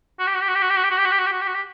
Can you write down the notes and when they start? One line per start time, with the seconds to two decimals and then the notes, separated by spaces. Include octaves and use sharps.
0.19 F#4
0.27 G4
0.34 F#4
0.41 G4
0.48 F#4
0.54 G4
0.62 F#4
0.69 G4
0.76 F#4
0.83 G4
0.91 F#4
0.97 G4
1.05 F#4
1.11 G4
1.18 F#4
1.26 G4
1.32 F#4
1.40 G4
1.47 F#4
1.54 G4